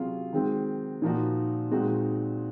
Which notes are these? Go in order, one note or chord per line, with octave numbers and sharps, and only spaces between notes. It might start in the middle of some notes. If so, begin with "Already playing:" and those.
Already playing: C3 F#3 C#4 F4 G#4
D#3 G#3 C4 F#4
A#2 F3 A#3 D#4 F#4
A#2 G#3 C4 D#4 F#4